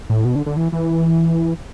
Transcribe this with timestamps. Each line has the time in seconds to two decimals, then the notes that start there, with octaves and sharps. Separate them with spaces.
0.09 A2
0.25 B2
0.35 D3
0.46 D3
0.57 E3
0.72 E3